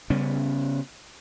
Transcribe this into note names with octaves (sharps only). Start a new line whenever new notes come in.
C#3 G3 B3 C#4